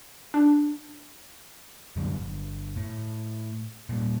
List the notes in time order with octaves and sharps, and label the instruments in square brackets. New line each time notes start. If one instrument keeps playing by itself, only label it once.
[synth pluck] D4
[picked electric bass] F#2 D3 F#3 G3
G1
A2
A#2 G3